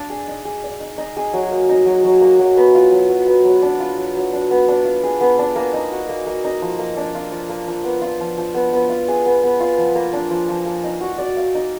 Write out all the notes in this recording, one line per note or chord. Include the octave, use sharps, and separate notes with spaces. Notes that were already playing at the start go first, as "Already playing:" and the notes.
Already playing: D4 D5 F5
G#4
D#4
G#4
D5
D#4
D#4
G#4
F#3
A#3
D#4
F#3
F#3
A#3
F#3
B3
F4
F#3
F#3
B3
F#3
D4
F4
F#3
F#3
D4
B3
D4
F4
G#4
B3
D4
A#3
D#4
F#4
A#3
A#3
D#4
F3
A#3
D4
F4
F3
A#3
F3
B3
F4
F3
F3
B3
B3
F4
G#4
B3
B3
F4
F3
A#3
D4
F3
F3
A#3
D#4
F#4
D5
F5
D#4